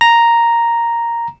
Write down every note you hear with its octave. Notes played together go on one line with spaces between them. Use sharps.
A#5